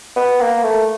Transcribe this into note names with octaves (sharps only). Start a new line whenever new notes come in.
B3
A#3
A3